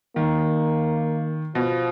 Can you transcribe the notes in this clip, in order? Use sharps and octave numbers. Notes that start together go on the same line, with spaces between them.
D#3 A#3
B2 F3